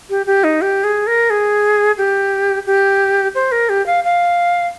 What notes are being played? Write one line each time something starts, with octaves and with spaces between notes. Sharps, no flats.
G4
G4
D#4
G4
G#4
A#4
G#4
G4
G4
C5
A#4
G4
F5
F5